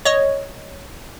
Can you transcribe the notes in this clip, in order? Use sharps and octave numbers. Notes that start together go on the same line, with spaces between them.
C#5 D#5